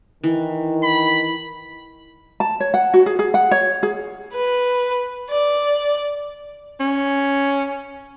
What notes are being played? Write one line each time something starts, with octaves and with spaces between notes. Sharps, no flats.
D#3 E3
B5
A5
C#5
F#5
F#4
G#4
G#4
F#5
C#5
G#4
B4
D5
C#4